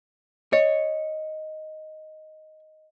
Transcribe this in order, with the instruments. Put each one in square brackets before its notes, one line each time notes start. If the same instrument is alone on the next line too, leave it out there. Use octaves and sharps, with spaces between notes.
[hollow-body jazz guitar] C#5 [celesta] D#5